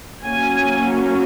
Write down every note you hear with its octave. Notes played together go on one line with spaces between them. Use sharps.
F#3 A#3 C#4 G#5